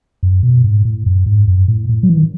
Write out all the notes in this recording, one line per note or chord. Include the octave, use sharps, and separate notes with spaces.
F#2
B2
G#2
A2
F#2
G#2
F#2
A2
A2
F#3
E3
D#3